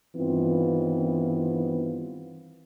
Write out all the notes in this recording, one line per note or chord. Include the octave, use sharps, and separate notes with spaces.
G2 D#3 E3 B3 C4 F4